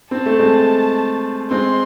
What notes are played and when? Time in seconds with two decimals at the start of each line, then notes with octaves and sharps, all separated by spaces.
0.11 C4 A5
0.26 A3
0.39 G#3 C4
1.51 G#3 C4 C6